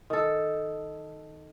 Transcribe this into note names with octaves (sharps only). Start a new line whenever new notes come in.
D#3 A4